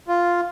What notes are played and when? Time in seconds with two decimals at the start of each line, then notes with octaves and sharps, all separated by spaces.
0.08 F4